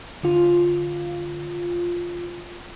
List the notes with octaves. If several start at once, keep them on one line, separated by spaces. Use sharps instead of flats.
D3 F4